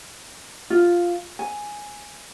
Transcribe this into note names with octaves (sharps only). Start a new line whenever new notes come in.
F4
G#5